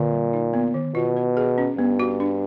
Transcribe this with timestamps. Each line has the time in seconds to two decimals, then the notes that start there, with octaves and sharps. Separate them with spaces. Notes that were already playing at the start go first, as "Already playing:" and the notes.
Already playing: A#2 D3
0.12 G3
0.33 D#4
0.54 B3
0.74 D#3
0.95 B2 F4
1.17 B4
1.37 G#4
1.58 C#4
1.78 G2 B3
1.99 F#4
2.20 D4